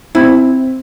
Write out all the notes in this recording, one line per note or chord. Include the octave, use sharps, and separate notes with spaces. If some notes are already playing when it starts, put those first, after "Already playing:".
C4 E4